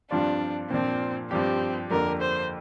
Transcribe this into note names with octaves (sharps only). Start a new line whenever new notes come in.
G2 F3 C4 D4 F4 D5
A#2 F3 C4 D4
G2 F3 C4 D4 G4
F2 D3 A#3 D4 A#4
C5